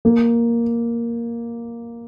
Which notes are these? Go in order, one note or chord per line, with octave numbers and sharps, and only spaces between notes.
A#3